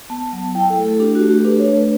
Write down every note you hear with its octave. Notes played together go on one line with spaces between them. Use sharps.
B3 A5
F#3
E4 G5
A4
A3
A4
D4 G4
F#4
A3
G4
A4
D4 B4
C#5
A3
B4